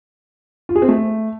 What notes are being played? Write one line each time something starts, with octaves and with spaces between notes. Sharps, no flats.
F4
G#4
C4
A3